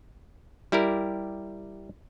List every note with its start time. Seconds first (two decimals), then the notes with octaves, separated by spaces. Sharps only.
0.72 G3 E4 G4 A#4